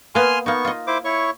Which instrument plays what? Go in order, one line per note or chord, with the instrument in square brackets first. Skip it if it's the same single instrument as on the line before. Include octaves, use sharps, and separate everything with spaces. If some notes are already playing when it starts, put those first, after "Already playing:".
[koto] A#3 B3 [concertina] G#5 C6 F6
[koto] A#3 D#4 [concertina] B3 C#6
[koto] F4 D#5
[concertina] E4 C5 D6
E4 C#5 C#6